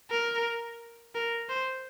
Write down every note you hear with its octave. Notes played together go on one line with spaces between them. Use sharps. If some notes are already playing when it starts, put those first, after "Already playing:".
A#4
A#4
C5